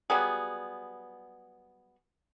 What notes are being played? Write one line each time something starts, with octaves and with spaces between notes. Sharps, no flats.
F#3 G3 B3 G#4